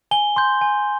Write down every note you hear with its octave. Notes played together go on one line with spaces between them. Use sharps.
G#5 G7
C6 G6
G#5